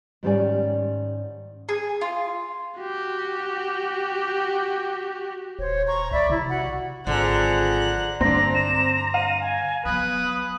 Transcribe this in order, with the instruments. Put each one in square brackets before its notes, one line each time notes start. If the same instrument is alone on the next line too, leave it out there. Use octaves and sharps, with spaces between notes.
[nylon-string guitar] G#2 D#3 G3 C#4 D5 G#5
[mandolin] G#4
F4
[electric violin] F#4 G4
[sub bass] D#1 [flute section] C5 C#5
[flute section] A#5 C#6
[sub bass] B1 [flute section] D5 E5 B5
[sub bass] C3 [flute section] E4
[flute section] F#4 F#5
[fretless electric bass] G#1 [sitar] D3 [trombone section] F3 C4 G#4 [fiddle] A#5 F#6
[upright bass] G2 D3 [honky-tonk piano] C4 D4 [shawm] A#5 [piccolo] A#6
[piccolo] E7
[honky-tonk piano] F5 [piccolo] D#7
[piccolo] G#5
[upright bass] F#3 B3 [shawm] B4 [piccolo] D#6